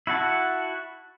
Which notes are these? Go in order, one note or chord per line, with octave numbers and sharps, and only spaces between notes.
E4 F#4 F#5 A5